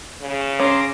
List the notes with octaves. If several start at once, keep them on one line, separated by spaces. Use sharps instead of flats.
C#3
C#4 A#5 C6 D6